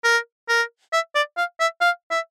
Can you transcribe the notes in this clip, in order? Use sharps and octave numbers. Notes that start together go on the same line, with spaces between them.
A#4
A#4
E5
D5
F5
E5
F5
E5